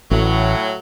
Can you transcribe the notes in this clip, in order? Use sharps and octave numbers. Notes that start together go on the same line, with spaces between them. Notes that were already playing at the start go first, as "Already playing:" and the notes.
A1 A2 F#3